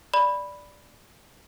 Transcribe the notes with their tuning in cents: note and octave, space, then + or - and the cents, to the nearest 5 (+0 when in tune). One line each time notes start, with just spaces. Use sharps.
D5 +0 B5 +0